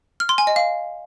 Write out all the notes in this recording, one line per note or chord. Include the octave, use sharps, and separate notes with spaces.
F6
C6
G#5
D#5
F5